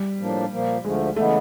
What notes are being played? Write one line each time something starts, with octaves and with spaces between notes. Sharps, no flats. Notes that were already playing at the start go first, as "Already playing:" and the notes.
Already playing: G3
A2 F3 A#3 D4
A#2 F3 A#3
D2 D3 F3 G#3 A3
C#3 E3 G#3 A3 B3